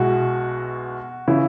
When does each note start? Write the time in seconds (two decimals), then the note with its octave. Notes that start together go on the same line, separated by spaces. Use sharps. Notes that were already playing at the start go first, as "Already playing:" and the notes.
Already playing: B1 B2 G#3 E4 F#4 G#4
1.28 C#3 E3 E4